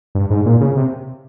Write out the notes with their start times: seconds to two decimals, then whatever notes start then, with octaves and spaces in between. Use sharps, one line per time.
0.15 G2
0.30 G#2
0.46 A#2
0.61 C#3
0.76 C3